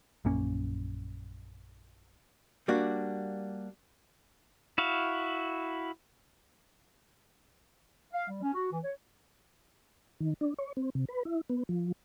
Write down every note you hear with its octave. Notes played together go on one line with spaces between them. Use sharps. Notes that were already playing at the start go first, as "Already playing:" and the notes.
A#1 F#2 A#3 C#4
G3 A#3 D4 F#4
E4 F#4 F5
F5
G3
C#4
F#4
E3
C#5
D#3
D4
C#5
C4
C3
B4
E4
B3
F3